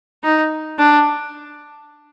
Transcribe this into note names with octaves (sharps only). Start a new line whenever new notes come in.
D#4
D4